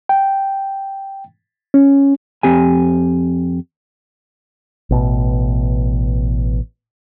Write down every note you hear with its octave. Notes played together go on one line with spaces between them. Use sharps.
G5
C#4
F2 C4 G4 G#5
A1 B2